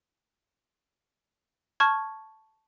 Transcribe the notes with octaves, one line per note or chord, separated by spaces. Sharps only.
A5 C#6 F6 G#6